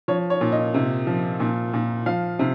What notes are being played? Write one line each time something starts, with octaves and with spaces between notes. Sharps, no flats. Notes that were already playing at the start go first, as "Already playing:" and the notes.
F3 C#5
C#5
A#2
D#5
C3
F3
A#2
A#2
F3 F5
C3